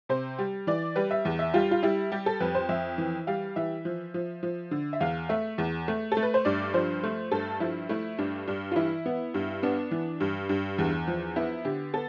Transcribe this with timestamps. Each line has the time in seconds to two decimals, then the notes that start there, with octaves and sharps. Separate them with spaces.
0.09 C3 C5
0.39 G3
0.67 E3 D5
0.96 G3 B4
1.11 E5
1.25 E2
1.39 E5
1.54 G3 F4
1.71 F4
1.83 G3 E4
2.12 G3 G4
2.26 A4
2.40 F2 B4
2.55 C5
2.69 F2 E5
2.98 E3
3.27 G3 F5
3.56 E3 E5
3.85 F3
4.14 F3
4.43 F3
4.71 D3
4.93 E5
5.01 E2 F5
5.29 A3 E5
5.58 E2
5.88 A3
6.12 A4
6.17 A3
6.23 B4
6.34 C5
6.45 G2 D5
6.74 F3 C5
7.03 A3
7.32 G2 A4
7.60 F3 E4
7.89 A3 E4
8.18 G2 D4
8.47 G2 D4
8.71 F4
8.76 E3 E4
9.06 B3
9.34 G2
9.63 B3 D4
9.91 E3
10.20 G2
10.49 G2
10.78 E2
11.08 F3
11.36 B3 E4
11.65 D3 G4
11.94 B3 A4